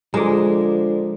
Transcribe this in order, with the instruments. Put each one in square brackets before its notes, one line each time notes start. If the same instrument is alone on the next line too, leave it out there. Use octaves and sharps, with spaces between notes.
[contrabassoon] D3 [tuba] F3 [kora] G#3 [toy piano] G#4 A#5